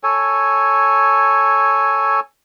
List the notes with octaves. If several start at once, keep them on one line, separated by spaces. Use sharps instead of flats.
A4 C#5 G#5